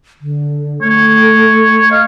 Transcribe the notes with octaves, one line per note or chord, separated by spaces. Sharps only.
D3
A3 C#5
D#5 F5